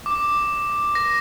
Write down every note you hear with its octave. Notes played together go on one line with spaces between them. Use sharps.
D6
A#6